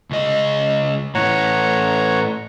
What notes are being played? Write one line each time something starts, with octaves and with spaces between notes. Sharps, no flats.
C#2 D#5
A2 E3 C#5 F#5 A#5